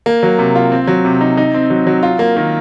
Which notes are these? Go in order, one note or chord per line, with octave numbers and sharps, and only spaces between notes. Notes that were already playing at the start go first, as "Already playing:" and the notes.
A#3
F#3
C3
F4
C4
F#3
C3
D#4
D#4
C4
F#3
F#3
F4
A#3
D#3